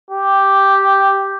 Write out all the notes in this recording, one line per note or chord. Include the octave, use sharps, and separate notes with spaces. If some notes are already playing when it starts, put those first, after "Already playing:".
G4